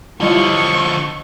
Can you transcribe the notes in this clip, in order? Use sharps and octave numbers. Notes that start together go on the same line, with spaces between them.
D3 F3 G3 E4 F4 C#5 D#5 C#6